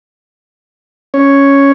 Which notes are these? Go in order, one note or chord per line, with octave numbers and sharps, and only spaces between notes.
C#4 C#5